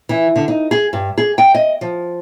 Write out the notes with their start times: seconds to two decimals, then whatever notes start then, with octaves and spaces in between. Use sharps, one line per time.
0.09 E3
0.36 D3
0.48 D#4
0.71 G#4
0.93 G2
1.18 G#4
1.38 G5
1.54 D#5
1.81 F3